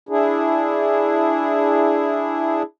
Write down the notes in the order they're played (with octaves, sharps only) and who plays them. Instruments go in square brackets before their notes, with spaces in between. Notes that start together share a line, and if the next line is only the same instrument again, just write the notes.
[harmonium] D4 E4 G#4